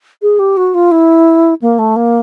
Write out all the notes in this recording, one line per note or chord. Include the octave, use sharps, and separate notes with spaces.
G#4
G4
F#4
F4
E4
A#3
A3
A#3